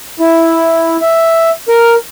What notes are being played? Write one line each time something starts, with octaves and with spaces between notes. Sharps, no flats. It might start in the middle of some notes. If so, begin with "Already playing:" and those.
E4
E5
A#4